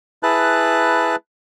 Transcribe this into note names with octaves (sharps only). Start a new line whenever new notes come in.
E4 G#4 B4 A5 F#6